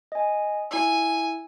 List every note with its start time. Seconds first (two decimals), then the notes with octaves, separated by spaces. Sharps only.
0.12 D#5 G#5
0.71 E4 G#5 E6